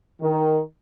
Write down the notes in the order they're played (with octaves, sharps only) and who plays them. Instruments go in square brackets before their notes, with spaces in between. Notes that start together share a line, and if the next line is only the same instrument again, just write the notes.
[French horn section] D#3